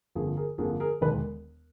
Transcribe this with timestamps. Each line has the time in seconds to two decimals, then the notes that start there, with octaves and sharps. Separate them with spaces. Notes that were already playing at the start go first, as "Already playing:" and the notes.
0.15 G1 F2 D3 F3 A#3 G#4
0.37 G#4 A#4
0.58 G1 F2 D3 F3 A#3 G#4
0.80 G#4 A#4
1.01 E1 D#2 D#3 G#3 A4 B4